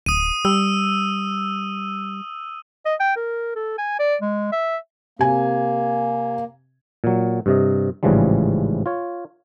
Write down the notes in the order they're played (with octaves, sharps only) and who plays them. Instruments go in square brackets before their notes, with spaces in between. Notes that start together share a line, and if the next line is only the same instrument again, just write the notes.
[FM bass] D1 [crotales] D#6 D#7
[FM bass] G3 [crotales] E6
[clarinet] D#5
G5
A#4
A4
G#5
D5
G#3
E5
[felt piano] C3 G#5 [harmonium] A#3
[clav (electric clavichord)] A#2 F#3
G2 C3 D#5
A1 G#2 C#3 E3 F3 G3
F4 C#5